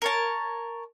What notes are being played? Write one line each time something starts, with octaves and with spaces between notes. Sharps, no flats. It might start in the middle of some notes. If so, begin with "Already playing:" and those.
A#4 C#5 A5